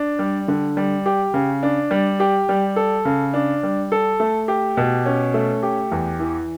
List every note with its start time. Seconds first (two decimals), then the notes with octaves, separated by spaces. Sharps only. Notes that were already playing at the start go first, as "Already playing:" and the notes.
Already playing: D4
0.19 G3
0.48 D3
0.77 G3
1.06 G4
1.34 C#3
1.63 D4
1.91 G3
2.20 G4
2.49 G3
2.76 A4
3.05 C#3
3.34 D4
3.63 G3
3.92 A4
4.20 A3
4.48 G4
4.77 B2
5.06 C#4
5.34 A3
5.63 G4
5.92 E2
6.19 E3